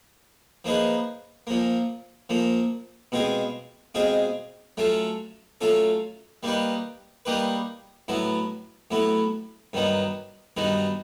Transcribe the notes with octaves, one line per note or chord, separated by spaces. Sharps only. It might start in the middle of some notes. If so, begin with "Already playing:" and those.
F3 A#3 D#4 G#4 B4
A#2 F3 A#3
A#2 F3 A#3
B2 G#3 C4 F4 G#4
B2 G#3 C4 F4 G#4
F#3 A3 C#4 F4 A4
F#3 A3 C#4 F4 A4
G3 A#3 D#4 G4 B4
G3 A#3 D#4 G4 B4
A2 F#3 B3 E4
A2 F#3 B3 E4
G2 D#3 F#3 B3 D#4
G2 D#3 F#3 B3 D#4